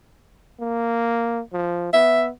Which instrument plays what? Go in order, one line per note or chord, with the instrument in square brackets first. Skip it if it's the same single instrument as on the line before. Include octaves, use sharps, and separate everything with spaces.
[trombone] A#3
F3
[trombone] B3 [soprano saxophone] E5